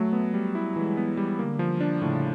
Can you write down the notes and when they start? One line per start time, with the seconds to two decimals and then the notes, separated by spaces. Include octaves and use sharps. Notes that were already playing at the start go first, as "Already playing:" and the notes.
Already playing: F#3 A3
0.13 B3
0.34 G3
0.55 E4
0.76 E3 G#3
0.97 B3
1.17 G3
1.38 D3 A#3
1.59 F3
1.81 D4
2.01 A2 C#3